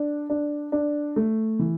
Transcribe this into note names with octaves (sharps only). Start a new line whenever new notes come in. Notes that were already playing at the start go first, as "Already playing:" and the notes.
Already playing: D4
D4
D4
A3
E3